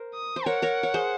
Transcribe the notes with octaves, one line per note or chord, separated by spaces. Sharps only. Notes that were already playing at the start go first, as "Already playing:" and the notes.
Already playing: A#4 C5
D#6
C5
A#4 C#5 F#5
A#4 C#5
C#5
G#4 C5